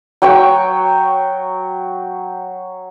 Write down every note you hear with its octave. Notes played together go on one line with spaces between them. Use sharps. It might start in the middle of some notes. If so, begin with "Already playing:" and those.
F#3 G5 C#6